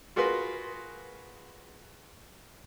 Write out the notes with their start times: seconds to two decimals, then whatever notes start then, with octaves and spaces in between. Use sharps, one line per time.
0.16 F4 F#4 G#4 A#4 B4 C6